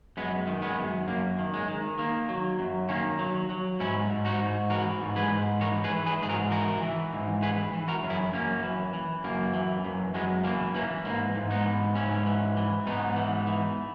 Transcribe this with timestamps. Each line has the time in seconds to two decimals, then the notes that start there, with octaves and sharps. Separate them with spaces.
0.17 F#2 G#3 B3
0.47 D#3
0.62 G#3 B3
0.78 F#2
1.08 F#2 A#3
1.39 D#3
1.54 G#3
1.68 D#3
1.98 D#3 A#3
2.29 F#3
2.59 F#2
2.89 D#3 A#3 C#4
3.19 F#3
3.50 F#3
3.80 G#2 C#4 E4
4.10 G#2
4.25 D#4 F#4
4.40 G#2
4.70 E3 F#4 A#4
5.01 G#2
5.16 G#4 B4
5.31 G#2
5.61 E3 A#4 C#5
5.84 G#4 B4
5.91 E3
6.06 G#4 B4
6.22 G#2 G#4
6.29 F#4 A#4
6.51 E3 F#4 A#4
6.82 E3
7.13 G#2
7.42 E3 G#4 B4
7.73 E3
7.88 F#4 A#4
8.03 F#2
8.10 E4 G#4
8.33 F#2 A#3 C#4
8.63 E3
8.94 E3
9.24 F#2 A#3
9.54 E3
9.84 F#2
10.14 F#2 G#3 B3
10.44 E3 A#3
10.75 E3 A#3 C#4
11.05 G#2 A#3
11.35 G#2
11.51 B3 D#4
11.65 E3
11.95 G#2 C#4 E4
12.26 E3
12.57 E3
12.87 G#2 B3 D#4
13.16 E3
13.47 E3